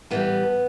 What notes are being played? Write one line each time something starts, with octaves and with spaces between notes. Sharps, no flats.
A2 E3 G3 B3